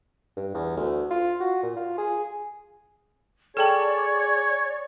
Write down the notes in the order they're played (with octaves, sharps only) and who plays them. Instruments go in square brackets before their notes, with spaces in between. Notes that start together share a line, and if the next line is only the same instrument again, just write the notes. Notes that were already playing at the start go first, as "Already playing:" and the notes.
[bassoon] G2
E2
D2
F4
F#4
A#2
F4
G#4
[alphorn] G#4 [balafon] A4 G5 A5 [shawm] C#5 [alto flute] D5